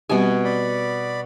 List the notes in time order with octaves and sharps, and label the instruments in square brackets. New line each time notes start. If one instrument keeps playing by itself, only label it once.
[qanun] B2 G#5 [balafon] G3 C4 G4
[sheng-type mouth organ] D5 B5